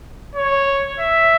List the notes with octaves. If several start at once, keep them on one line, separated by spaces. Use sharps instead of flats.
C#5
E5